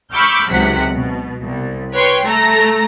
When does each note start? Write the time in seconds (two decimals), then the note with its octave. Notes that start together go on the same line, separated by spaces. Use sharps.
0.12 B5 C#6 D6 E6 F6 G6
0.51 G#1 C#2 C3 F#3 F#5 B6
0.93 B2
1.40 C2
1.94 B4 C#5 G5 C6
2.25 A3 A4 A#5 A#6